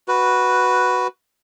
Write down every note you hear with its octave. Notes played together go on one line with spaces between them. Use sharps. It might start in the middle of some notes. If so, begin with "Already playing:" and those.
F#4 B4